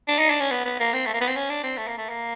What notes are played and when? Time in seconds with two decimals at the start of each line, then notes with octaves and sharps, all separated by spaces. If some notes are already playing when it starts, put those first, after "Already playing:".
0.08 D4
0.19 D#4
0.30 D4
0.40 C#4
0.51 B3
0.65 B3
0.80 A#3
0.93 C4
1.07 A3
1.13 A#3
1.21 B3
1.28 C4
1.36 C#4
1.50 D4
1.63 C4
1.78 A3
1.88 A#3
1.98 A3
2.09 A#3